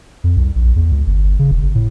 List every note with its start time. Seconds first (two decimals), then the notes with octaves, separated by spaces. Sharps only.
0.24 F2
0.37 C2
0.56 A#1
0.76 E2
0.92 C#2
1.07 G1
1.39 C#3
1.51 E1
1.63 G1
1.75 A2